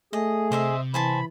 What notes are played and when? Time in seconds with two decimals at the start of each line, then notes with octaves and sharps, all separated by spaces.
0.13 A3 G#4 D#5
0.52 C3 C5 D#5 E5
0.94 E3 C5 G#5 A5 B5